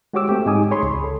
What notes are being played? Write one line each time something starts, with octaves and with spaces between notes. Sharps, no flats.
G#3 F#4 G4 C#5 D6 E6
A3 C4 G4
G#2 G#3 D#4 G#5 D6 D#6
G#4 C#5 B5 C6
C#2
A4